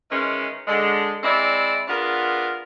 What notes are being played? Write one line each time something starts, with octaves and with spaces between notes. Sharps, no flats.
D#3 E3 G#3 C#4
D3 G#3
G#3 C4 E4 D5
B3 D4 F4 G#4 A#4